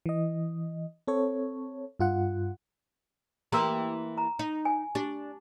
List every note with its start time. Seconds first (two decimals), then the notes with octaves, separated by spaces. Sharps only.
0.06 E3 D#5
1.07 C4 A4 C#5
1.99 G2 F4 F#5
3.52 E3 A#3 G4 A#5 C6 E6
4.18 A#5
4.39 D#4
4.65 G#5
4.95 D4 G4